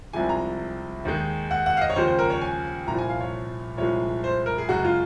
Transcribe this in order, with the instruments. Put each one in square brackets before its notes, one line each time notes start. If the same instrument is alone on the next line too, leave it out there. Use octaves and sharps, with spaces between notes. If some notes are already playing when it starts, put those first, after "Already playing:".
[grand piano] C2 C3 F3 G#3 G#5
A#5
D#2 D#3 G#3
F#5
F#5
F5
D#5
C#5
D#2 C#3 F3 G#3 C5
C5
A#4
C#5
G#5
C2 A#2 F3 A#5
G#5
F5
C#5
C2 A#2 F3 G#3 C#5
C5
A#4
G#4
F#2 C#3 G#3 F#4
F4